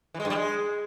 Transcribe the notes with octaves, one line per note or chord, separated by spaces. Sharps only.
E3
G#3
G2
G3
G#3